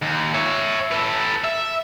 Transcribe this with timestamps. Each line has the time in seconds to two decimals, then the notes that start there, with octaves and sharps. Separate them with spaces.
0.03 D#2
0.34 C#5 E5
0.91 A4 B4
1.44 E5